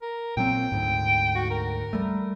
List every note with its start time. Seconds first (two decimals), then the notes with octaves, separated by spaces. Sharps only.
0.02 A#4
0.37 A#2 F#3 C4 G5
0.72 D2 G#2
1.35 F#4
1.50 A#4
1.93 G3 A3